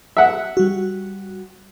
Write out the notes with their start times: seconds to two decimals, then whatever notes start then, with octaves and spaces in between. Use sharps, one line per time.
0.17 E5 F#5
0.57 G3 F#4